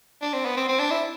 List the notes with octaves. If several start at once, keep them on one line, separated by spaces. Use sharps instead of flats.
D4
C4
B3
C4
C4
D4
E4